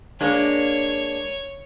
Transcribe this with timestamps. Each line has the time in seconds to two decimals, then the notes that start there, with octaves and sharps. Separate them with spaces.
0.21 G#3 A#3 D4 C#5